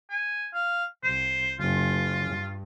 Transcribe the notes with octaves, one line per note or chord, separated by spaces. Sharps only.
G#5
F5
C2 C5
F#1 F4
G2